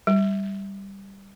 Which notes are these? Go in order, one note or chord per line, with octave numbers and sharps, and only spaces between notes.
G3